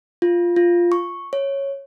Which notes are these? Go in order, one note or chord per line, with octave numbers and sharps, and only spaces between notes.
F4
F4
C#6
C#5